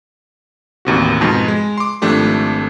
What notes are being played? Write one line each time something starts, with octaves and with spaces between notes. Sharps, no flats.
A1 D#2 C3 F#4
F2 G#2 B2 A5
G#3
C6 D6
G#1 F3 A3 D4 G4